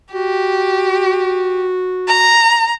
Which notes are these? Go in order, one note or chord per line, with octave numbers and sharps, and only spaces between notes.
F#4 G4
A#5